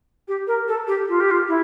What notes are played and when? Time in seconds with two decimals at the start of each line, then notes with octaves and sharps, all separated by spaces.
0.28 G4
0.47 A#4
0.68 A4
0.87 G4
1.09 F4
1.20 G4
1.31 F4
1.48 E4